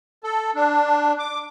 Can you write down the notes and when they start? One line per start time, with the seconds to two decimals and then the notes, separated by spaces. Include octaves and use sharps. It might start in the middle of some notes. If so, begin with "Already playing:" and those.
0.24 A4
0.55 D4
1.19 D6